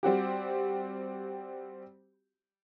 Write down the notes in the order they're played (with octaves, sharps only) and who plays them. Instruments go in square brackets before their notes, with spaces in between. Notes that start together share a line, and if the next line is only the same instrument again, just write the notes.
[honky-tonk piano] G3 C4 F#4 G4